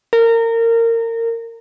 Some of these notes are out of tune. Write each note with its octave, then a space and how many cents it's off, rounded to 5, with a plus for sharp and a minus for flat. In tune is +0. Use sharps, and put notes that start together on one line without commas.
A#4 -25